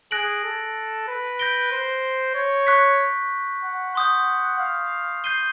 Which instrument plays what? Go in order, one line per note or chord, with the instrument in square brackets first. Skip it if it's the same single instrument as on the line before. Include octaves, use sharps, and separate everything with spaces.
[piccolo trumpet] G#4 [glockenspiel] F#6 A#6 D7 F#7
[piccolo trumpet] A4
B4
[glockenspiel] G6 A#6 D7 G7
[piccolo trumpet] C5
C#5
[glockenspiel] C#6 F#6 B6
[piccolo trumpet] F#5
[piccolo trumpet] F#5 [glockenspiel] C6 D#6 G6
[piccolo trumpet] F5
[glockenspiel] G6 C7 D#7 G7